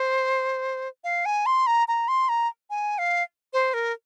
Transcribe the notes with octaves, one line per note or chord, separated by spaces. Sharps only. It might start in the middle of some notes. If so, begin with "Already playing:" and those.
Already playing: C5
F5
G#5
C6
A#5
A#5
C6
A#5
G#5
F5
C5
A#4